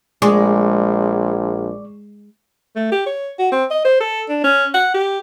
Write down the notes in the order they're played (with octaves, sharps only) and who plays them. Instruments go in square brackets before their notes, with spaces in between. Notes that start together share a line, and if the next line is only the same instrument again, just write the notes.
[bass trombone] A#1 [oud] G#3 [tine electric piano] D5 C#6 D6
[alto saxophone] A3
G4
C#5
F#4
C4
D#5
C5
A4
D4
C#4
F#5
G4